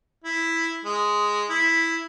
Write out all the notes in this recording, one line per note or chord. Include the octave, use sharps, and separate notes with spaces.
E4
G#3
E4